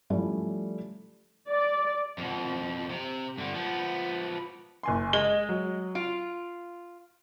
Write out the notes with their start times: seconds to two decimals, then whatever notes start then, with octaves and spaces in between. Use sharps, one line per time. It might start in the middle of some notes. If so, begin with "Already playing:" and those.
0.10 F3 G3 A3 C#4 E4
1.48 D5
2.18 F2 B2
2.90 C3
3.38 G2 D3
3.54 F3 B3
4.83 F#1 G#5 C6
5.13 G#3 G7
5.49 F#3
5.95 F4 D7